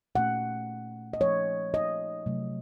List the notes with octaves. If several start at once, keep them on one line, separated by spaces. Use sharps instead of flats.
A#2 A3 C#4 F#5
D#5
F3 A3 C#4 C#5
D#5
C3 F#3 A3